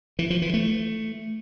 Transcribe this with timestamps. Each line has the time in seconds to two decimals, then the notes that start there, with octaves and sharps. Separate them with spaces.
0.19 E3
0.30 F3
0.42 E3
0.54 A3